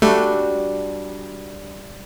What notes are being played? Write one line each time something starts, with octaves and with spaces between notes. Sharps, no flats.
G3 A3 D4 F#4